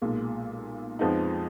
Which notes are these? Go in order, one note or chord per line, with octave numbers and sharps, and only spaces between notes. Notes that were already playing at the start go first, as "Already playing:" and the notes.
B1 A#2 G#3
F2 F3 G#3 B3 D#4